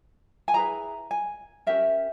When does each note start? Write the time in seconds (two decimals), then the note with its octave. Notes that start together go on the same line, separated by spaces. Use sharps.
0.48 G#5
0.54 E4 G#4 B4 A#5
1.11 G#5
1.67 C#4 G4 A#4 E5